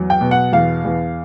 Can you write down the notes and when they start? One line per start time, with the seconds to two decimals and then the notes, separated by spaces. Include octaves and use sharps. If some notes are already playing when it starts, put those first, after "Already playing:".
Already playing: E2 F#3
0.10 G5
0.21 B2
0.31 F#5
0.53 E2 F5
0.85 E2